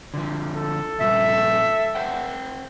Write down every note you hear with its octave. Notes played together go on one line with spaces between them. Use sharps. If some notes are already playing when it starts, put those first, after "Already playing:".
D3 F3
A4
A#2 F3 G3 E5
C5 F#5 G5